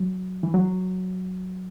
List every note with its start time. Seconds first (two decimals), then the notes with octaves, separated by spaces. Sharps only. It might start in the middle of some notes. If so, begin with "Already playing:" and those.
Already playing: F#3
0.43 E3
0.54 F#3